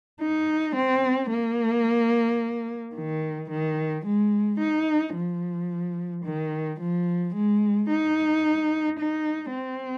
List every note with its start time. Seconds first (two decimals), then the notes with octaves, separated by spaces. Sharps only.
0.21 D#4
0.76 C4
1.30 A#3
2.96 D#3
3.50 D#3
4.06 G#3
4.60 D#4
5.15 F3
6.25 D#3
6.80 F3
7.35 G#3
7.90 D#4
8.99 D#4
9.54 C4